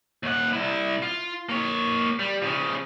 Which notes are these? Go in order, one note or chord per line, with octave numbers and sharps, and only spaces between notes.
D#2 F#5
C2 E4
F4
A#3 C#5
G3
C#3 F3